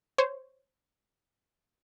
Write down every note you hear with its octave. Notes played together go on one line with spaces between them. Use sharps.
C5 C#5